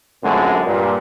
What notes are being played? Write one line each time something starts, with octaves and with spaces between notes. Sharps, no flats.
F#2 A#2 D3 G#3 A3 C4
G2 A#2